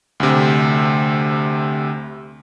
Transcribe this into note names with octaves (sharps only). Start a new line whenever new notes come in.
D2 C3